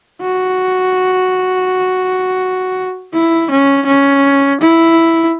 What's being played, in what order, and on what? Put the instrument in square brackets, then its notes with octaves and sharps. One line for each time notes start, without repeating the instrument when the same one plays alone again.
[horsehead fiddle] F#4
E4
C#4
C#4
E4